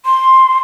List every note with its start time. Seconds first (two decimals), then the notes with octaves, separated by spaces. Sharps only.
0.06 C6